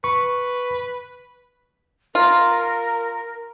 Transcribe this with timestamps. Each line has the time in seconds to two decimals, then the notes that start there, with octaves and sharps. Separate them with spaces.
0.04 B4 C#6
2.15 F4 A#4